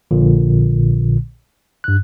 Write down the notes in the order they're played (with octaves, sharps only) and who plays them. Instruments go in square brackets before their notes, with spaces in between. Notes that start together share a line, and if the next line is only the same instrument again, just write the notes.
[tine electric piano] A#1 A#2 D3
G2 F#6